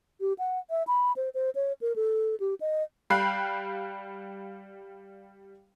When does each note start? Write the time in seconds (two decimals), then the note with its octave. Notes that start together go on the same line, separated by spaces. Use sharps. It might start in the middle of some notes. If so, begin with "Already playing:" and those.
0.21 G4
0.39 F#5
0.70 E5
0.87 B5
1.16 C5
1.34 C5
1.55 C#5
1.81 A#4
1.96 A4
2.40 G4
2.61 D#5
3.10 G3 F5 G5 B5 F#6 C7